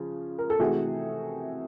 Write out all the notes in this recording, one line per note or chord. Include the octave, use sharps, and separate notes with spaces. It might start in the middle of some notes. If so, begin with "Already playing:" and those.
Already playing: C#3 F3
A#4
A4
C3 E3 A3 F#4 G#4